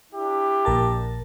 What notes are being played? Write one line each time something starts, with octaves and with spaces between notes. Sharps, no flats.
D4 E4 G4
A#1 A#4 A5